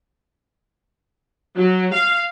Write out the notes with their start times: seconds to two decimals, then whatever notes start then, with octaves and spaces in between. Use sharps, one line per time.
1.57 F#3
1.94 F5